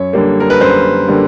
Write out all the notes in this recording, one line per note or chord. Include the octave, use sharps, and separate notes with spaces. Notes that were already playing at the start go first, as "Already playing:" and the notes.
Already playing: F#2 C#5
D3 G3 A#3
A#4
B4
F#2 C5
D3 G3 A#3